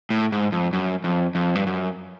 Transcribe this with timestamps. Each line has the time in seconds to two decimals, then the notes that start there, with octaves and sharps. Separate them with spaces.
0.10 A2
0.32 G#2
0.52 F2
0.73 F#2
1.04 F2
1.35 F2
1.55 G2
1.67 F#2